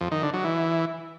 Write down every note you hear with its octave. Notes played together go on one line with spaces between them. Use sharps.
F2
D#3
D3
F#3
E3